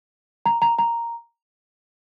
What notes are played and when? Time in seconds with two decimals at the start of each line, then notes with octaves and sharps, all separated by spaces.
0.46 A#5
0.62 A#5
0.79 A#5